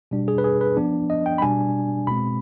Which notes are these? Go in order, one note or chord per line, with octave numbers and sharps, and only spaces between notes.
B2 G3 D4
G#4
B4
G#4
B4
F3 B3 D4
D#5
G5
B5
B2 G3 D4 G#5
B2 G#3 C4 B5